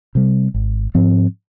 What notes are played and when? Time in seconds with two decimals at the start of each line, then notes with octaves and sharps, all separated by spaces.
0.15 C3 G3
0.54 G#1
0.95 G#2 F3 C4